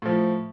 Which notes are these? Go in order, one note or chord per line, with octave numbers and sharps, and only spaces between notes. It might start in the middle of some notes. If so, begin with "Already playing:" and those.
A2 F3